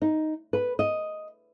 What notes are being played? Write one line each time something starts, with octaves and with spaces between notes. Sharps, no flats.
D#4
B4
D#5